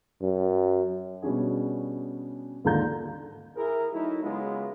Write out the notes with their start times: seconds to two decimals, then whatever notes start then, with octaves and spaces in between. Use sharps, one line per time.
0.21 F#2
1.22 B2 G3 C#4 D4 G#4
2.65 D#2 G#2 D3 F4 A#5 G6
3.56 E4 G#4 A#4
3.93 F#3 A3 D#4 E4
4.23 C#3 F#3 G#3 B3 E4 F4